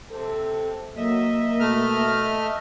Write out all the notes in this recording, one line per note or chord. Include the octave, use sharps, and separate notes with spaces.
C3 C4 A4
F#3 A#3 D#5 E5
B2 A3 F6